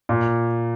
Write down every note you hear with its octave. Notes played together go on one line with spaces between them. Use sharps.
A#2